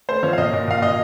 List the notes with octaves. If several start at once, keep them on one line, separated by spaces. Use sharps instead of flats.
A3 C5
F3 C#5
F5
A#2 D#5
A#2
A#2 F5
A#2 D#5